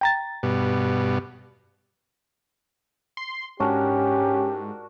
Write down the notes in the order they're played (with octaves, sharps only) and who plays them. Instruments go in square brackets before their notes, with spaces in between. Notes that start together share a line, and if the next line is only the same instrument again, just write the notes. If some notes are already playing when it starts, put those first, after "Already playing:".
[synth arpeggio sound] G5 A#5 A6
[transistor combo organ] G2 B2
[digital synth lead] C6
[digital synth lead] G#2 [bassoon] C#4 [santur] D4 F#4 A#4 [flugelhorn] G4